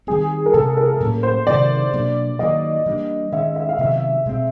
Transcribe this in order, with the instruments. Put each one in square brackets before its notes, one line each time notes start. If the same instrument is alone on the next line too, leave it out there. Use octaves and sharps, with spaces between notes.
[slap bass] D#3 G3 C4 [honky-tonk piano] G#4
[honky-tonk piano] A#4
[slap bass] C3 E3 G#3 [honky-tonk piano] A4
[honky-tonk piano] A#4
[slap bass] A2 F#3 A#3 C#4
[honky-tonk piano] C5
[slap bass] C3 D#3 F#3 B3 [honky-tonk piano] D5
[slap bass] B2 F#3 A#3 D4
[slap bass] D#3 F#3 A#3 [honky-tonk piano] D#5
[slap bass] E3 G3 A#3 D4
[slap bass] D#3 G#3 C#4 [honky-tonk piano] E5
[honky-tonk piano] E5
F5
[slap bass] C3 D#3 F#3 B3 [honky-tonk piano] E5
[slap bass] B2 G#3 C4